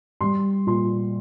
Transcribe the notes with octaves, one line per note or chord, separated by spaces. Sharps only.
G3 C6
A#2 C6